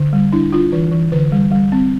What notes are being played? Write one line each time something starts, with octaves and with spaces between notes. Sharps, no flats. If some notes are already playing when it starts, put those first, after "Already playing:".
Already playing: D3
G3
D4 E4
D4 F4
E3 B4
E3
D3 B4
G3
G3
C4